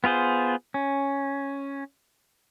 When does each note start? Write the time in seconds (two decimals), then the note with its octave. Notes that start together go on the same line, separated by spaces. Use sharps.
0.04 B3 F4 G#4 C5
0.74 C#4